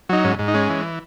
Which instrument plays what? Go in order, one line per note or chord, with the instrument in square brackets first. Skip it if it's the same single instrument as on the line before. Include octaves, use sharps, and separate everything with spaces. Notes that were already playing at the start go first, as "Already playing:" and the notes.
[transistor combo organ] F#3 D#4
G#2 C#4
G#2
D#4
G#3 C#4
E3